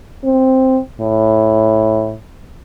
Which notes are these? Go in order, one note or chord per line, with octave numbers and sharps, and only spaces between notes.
C4
A2